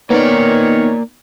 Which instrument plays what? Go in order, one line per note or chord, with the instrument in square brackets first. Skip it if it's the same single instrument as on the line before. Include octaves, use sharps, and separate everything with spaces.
[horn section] D#3 C#5 [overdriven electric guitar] A#3 D5 [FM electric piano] B3 D#4